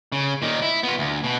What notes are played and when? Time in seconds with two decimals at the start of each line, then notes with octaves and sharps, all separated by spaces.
0.12 C#3
0.42 A#2 D#3
0.62 E4
0.83 B3 F4
0.99 D2
1.24 B2